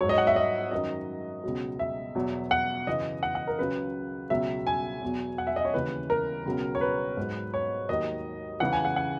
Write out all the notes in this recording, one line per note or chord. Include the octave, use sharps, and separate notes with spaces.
G#2 F#3 C#5
D#5
F#5
E5
D#5
F#2 D#3 F#3 D#5
C#2 B2 F#3
E5
E2 B2 F#3
F#5
F#2 C#3 E3 D#5
F#5
F#5
A#4
C#2 C#3 F#3 B4
C#2 B2 F#3 E5
G#5
E2 B2 F#3
F#5
E5
D#5
C#5
D#2 C#3 E3 B4
A#4
C#2 B2 F#3
C#5
B4
G#2 F#3
C#5
D#2 D#3 F#3 D#5
C#2 C#3 E3 F#5
G#5
F#5
F#5